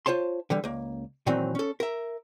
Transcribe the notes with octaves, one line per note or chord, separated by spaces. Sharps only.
F4 C5 C#5 A5 C6
D3 E3 G3
C#2 A#3
A#2 D#3 E3 F#3 C4 D#4
C#4 A4
A#4 E5